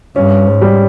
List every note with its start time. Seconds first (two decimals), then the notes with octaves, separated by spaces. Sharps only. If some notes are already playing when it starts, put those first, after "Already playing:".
0.16 G2 C#4
0.46 G#2
0.61 G3